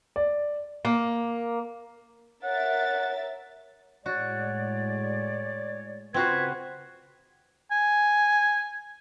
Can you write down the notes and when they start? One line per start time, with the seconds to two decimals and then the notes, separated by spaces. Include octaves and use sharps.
0.16 D5
0.85 A#3
2.43 A#4 C#5 E5 F#5 A6
4.06 A2 G#3 F#4 C#5 D5
6.14 C#3 C4 F4 F#4 B4 C5 G#6
7.71 G#5